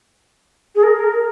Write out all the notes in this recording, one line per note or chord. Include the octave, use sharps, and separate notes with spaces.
G#4
A#4